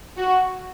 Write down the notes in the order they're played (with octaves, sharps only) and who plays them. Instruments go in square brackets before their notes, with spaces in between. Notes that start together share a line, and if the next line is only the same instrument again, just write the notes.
[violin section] F#4